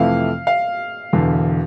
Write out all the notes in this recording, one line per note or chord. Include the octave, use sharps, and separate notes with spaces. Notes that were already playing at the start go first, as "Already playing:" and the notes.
Already playing: F2 C3 E3 A3 E4 F5
F5
E1 E2 D3